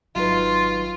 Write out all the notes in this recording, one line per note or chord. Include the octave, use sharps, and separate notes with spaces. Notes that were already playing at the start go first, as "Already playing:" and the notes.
G#1 F#3 D#4 F4 B4